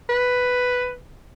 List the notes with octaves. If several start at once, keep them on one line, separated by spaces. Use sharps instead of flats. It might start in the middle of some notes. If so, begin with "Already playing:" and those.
B4